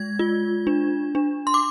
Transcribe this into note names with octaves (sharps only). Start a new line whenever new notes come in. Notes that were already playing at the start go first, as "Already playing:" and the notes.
Already playing: G#3 G#6
F4
D4
D4
C6
D6